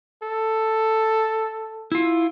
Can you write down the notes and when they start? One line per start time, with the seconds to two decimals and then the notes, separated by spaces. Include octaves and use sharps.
0.23 A4
1.92 E4 F4